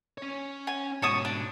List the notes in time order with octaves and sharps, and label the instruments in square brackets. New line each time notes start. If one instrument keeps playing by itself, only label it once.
[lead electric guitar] C#4 C#5
[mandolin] G#5
[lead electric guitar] G#2 B2 [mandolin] C#5 A5 D#6
[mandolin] D4